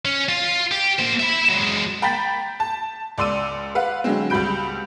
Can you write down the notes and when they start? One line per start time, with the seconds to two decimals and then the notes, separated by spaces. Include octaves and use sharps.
0.05 C#4
0.29 F4
0.71 G4
0.99 A#3 C5
1.19 E5 B5
1.49 F#3 G#3
2.02 G5 A#5 B5 G6 A6 B6
2.60 A5
3.18 C#2 D5 C6 E6 D#7
3.75 B4 F5 F#5
4.04 D3 F#3 G#3 C4
4.30 C#2 G3 F#4 B5 G6 D7